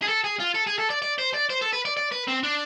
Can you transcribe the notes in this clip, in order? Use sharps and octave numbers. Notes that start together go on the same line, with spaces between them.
G#4
A4
G#4
F4
A4
G#4
A4
D5
D5
C5
D5
C5
A4
B4
D5
D5
B4
C4
D4